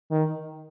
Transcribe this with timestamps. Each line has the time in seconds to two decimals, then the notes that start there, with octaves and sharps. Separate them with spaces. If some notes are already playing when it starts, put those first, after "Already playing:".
0.11 D#3